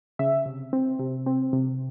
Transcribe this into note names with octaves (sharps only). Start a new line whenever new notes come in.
C#3 E5
C3
C4
C3
C4
C3